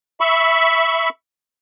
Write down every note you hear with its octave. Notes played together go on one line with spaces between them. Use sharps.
E5 B5 C#6